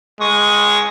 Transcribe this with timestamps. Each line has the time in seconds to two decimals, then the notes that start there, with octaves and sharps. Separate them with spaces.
0.20 G#3 C#6 D#6